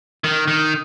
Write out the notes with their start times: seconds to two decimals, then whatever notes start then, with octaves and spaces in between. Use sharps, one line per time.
0.24 D#3
0.48 D#3